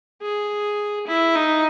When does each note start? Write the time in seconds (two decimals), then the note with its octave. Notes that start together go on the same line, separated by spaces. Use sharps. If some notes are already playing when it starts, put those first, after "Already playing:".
0.22 G#4
1.07 E4
1.35 D#4